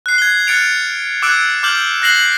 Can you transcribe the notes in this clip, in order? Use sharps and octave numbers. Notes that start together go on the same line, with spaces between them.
F#6 C7
G#6 G7
F6 F#6 A6 C#7 D7 F7
D6 E6 F#6 G#6 D7
D6 F6 G6 F#7
F#6 A#6 C7 F#7